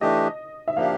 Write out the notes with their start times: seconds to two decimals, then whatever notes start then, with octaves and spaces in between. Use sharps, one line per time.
0.01 E3 A3 D4 G4 D#5
0.68 E5
0.76 F3 A#3 D4 G4 F5